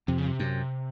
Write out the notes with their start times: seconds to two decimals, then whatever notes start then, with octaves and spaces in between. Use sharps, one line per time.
0.08 F2 C3
0.18 C#3
0.27 C3
0.39 F#2